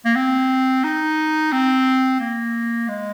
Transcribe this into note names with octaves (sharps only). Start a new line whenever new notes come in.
A#3
C4
D#4
C4
A#3
G#3